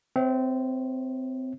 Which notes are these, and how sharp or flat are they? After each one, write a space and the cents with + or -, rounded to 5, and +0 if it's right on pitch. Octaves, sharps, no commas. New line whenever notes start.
C4 -20 C#5 -45 E5 +0